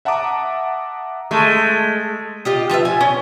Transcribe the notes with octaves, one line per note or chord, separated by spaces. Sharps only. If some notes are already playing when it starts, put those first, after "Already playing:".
E5 F#5 A5 A#5 D6 D#6
G#3 A3
F4 G4 D#5
F3 F4 B4 E5
G#5
C#4